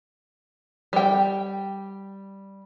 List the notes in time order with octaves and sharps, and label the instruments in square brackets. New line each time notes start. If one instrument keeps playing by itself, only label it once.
[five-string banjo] G3 G5